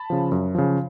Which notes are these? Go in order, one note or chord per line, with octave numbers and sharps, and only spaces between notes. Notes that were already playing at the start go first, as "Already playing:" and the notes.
Already playing: A5 B5
C#3 F3
F#2
C#3 F3